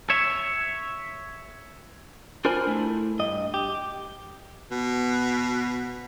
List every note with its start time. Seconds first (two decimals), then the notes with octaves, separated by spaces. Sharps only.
0.10 C#5 E5
2.45 D4 F4 A#4 C5 G#5 B5
2.67 A3 E4
3.19 G2 D#5
3.54 G4
4.71 B2